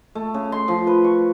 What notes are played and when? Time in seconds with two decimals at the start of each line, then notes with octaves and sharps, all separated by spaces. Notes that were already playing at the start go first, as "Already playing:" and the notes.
0.15 A3
0.34 C#3
0.52 C6
0.68 F3
0.87 B4
1.04 C#6